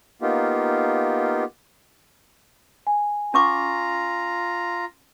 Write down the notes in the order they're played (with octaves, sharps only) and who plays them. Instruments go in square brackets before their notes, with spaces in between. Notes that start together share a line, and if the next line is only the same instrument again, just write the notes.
[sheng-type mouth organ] A#3 B3 D#4 F4 G4
[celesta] G#5
[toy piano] C#4 C#6 D6 [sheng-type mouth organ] F4 A#5